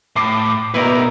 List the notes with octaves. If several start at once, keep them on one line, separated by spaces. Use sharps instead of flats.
A2 D6 C7
B2 D#3 E4 A#4 B4 D5